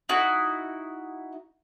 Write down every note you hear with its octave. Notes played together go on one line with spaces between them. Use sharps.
D#4 E4 F#4